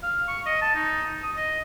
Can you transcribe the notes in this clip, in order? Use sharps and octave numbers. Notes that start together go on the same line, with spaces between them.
F5
C#6
D#5
A5
D#4
D#6
D#5